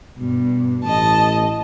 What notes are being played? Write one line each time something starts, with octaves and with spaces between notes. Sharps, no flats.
G2 B2
A1 D#5 A5